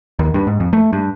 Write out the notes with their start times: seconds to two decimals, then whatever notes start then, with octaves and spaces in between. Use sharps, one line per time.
0.19 D#2
0.34 G2
0.47 G#2
0.60 F2
0.73 A3
0.93 G2